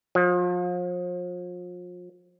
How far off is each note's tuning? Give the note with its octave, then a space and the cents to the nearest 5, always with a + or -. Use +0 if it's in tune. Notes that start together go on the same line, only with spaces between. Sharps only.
F3 +35